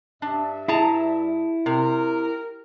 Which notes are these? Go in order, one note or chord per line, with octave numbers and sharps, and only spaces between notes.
G2 D4 E5
E4 G#4 A5 A#5
C3 A#4